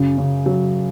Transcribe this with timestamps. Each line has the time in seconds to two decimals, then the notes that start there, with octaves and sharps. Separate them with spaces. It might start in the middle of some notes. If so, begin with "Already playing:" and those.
Already playing: F#2 C#3
0.18 C#3
0.46 F#3